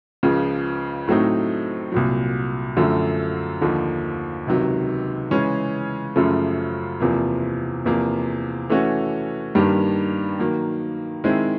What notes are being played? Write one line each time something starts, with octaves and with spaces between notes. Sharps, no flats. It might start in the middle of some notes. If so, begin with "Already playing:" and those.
C#2 C#3 F3
A2 F#3 A3 C4 D#4
C2 A#2 F#3
F#2 D3 F3 A3
D#2 D3 F3
C#2 C3 D#3 F#3
C#3 E3 G#3 C#4
F#2 C#3 F3 A3
E2 C3 F3 A#3
E2 C3 F3 A#3
E3 A3 C#4 F#4
G2 D#3 G3 A#3 D4
D#3 F#3 A#3
D#3 G#3 C4 E4